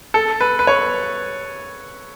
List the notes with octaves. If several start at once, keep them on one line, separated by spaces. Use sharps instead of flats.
A4
B4
B4
C#5